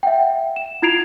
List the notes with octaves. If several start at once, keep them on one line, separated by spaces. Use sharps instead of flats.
E5 F#5 G5
E7
E4 F4 G#6 C7 D7 F7